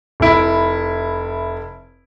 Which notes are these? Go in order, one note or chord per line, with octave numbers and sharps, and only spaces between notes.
F1 E4